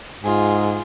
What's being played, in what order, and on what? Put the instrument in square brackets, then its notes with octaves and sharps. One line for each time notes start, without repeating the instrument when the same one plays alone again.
[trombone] G#2 [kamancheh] F4 G#4